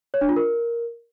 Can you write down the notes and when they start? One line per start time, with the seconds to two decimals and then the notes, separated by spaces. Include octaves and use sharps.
0.14 C#5
0.21 D4
0.29 F4
0.36 A#4